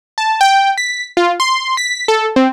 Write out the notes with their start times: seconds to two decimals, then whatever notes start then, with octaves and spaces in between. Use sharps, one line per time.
0.18 A5
0.41 G5
0.78 B6
1.17 F4
1.40 C6
1.77 B6
2.08 A4
2.36 C4